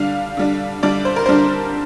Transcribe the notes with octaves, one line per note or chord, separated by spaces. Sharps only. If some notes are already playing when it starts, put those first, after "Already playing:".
Already playing: D3 G3 D4 F5
D3 G3 D4
D3 G3 D4 D5
C5
A#4
D3 G3 D4 C5